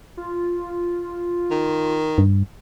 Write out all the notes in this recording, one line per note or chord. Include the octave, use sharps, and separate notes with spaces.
F4
D#3
G2